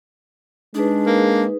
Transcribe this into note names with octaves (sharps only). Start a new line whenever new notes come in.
G#3 D4 D#4 G#4 B4
A#3